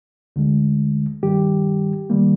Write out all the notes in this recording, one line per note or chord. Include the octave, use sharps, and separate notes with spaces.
D2 D3 G#3
G2 D#3 G3 G4
D#3 G3 A#3